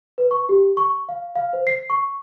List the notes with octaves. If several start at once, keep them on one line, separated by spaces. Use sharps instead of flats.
B4
C#6
G4
C#6
F5
F5
C5
C7
C#6